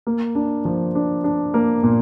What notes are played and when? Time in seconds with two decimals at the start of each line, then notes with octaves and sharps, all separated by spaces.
0.07 A#3
0.35 D4
0.65 F3
0.95 D4
1.24 D4
1.54 A#3
1.83 A#2